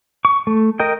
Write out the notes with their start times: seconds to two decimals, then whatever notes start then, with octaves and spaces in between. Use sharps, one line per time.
0.25 C#6
0.47 A3
0.80 A#4 D#5 G5